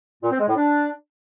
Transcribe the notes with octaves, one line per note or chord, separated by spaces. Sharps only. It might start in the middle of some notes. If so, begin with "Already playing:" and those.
A#2
C4
G#3
A2
D4